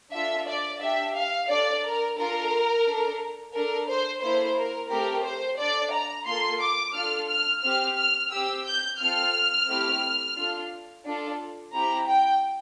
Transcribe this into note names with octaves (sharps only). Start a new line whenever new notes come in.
D4 F4 A4 E5
D5
D4 G4 E5
F5
D4 A4 D5
A#4
D4 F4 A4 A#4
D4 A4
D4 A4 A#4
C5
A#3 E4 A4 C5
A#4
A3 C4 G4 A#4
C5
D4 A4 D5
A#5
A#3 F4 A4 C6
D6
D4 F4 A4 F6
F6
C4 G4 F6
F6
C4 G4 E6
G6
C4 F4 A4 F6
A3 C4 E4 G4
D4 F4 A4
D4 F4 A4
C4 E4 G4 A#5
G5